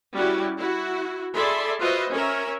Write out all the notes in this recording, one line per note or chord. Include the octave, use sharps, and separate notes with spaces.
G3 C#4 E4 F#4 G4
E4 F#4
G#4 A4 D5 E5 B5 C6
F4 F#4 B4 C5 D#5 E5
C#4 A#4 E5